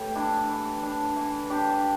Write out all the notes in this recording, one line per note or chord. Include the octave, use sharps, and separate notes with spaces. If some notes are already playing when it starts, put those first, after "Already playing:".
Already playing: A2 E3 G4 A4
D4 E4
E3
D4
E3
D4 G4